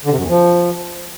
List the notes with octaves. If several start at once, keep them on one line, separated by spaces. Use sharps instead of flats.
D3
C3
F#2
E2
F3